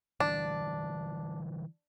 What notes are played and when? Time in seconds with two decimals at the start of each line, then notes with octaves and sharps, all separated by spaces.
0.20 D3 E3 G3 D4